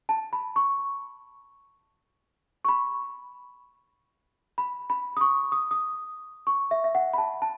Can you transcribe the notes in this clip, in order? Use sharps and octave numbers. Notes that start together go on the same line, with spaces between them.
A5
B5
C#6
C#6
B5
B5
B5
D#6
C#6
D#6
D#6
C#6
E5
E5
F#5
B5
A5
A5